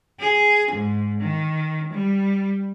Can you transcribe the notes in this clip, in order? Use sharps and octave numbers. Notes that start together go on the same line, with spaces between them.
G#4
G#2
D#3
G3